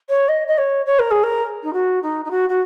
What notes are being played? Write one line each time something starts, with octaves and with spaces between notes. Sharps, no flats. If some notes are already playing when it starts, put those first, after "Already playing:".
C#5
D#5
D#5
C#5
C#5
A#4
G#4
A#4
D#4
F#4
D#4
D#4
F#4
F#4